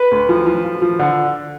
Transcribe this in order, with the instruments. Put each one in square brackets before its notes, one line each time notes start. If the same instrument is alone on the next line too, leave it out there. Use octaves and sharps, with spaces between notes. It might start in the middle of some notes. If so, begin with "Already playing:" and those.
Already playing: [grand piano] B4
D2
F3
F3
F3
F3
D3